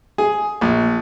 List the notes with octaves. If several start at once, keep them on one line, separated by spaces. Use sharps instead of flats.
G#4
A#1